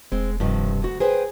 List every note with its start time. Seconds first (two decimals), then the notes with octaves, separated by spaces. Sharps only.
0.12 E1 G#3 C4
0.40 G2 C3 D#3 F3
0.82 D2 F#4
1.00 G#4 B4 C5 G5